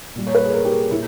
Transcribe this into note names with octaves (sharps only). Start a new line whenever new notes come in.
A#2 G3
C#5
B4
G#4
A#4
G4
G#4
A#2 E4